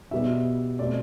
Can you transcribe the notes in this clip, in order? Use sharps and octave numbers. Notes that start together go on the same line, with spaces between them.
B2 G3 B3 E5
B2 A3 C4 D5